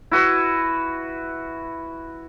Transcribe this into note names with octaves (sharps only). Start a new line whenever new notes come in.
E4 F#4 B4